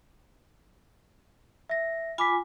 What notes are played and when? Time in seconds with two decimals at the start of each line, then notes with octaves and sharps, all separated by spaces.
1.69 E5 A#6
2.18 F4 G#5 B5 D6 B6